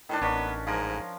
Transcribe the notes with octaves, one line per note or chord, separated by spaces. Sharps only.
A2 D#3 D4
A1 B3 C#4 D4
G#2 F3 A#4